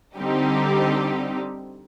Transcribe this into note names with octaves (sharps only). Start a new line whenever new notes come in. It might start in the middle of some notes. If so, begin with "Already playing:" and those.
D3 G3 C4 D#4 G4